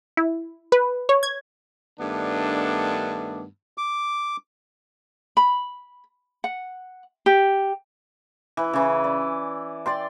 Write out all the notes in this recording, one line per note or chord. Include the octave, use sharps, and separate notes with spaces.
E4
B4
C#5
G#6
G2 D#3 A3 B3 D4
D6
B5
F#5
G4
E3
C#3 E3
D5
D5 G5 C6